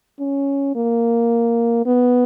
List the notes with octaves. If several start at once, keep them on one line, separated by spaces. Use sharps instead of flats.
C#4
A#3
B3